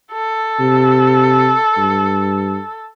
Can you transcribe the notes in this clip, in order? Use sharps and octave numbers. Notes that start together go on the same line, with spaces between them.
A4
C3
G2